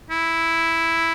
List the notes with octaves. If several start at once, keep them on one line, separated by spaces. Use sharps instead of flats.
E4